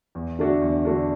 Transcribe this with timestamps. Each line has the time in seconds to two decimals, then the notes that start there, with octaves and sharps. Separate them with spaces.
0.15 E2
0.39 D3 A3 D4 F#4
0.61 E2
0.85 D3 A3 D4 F#4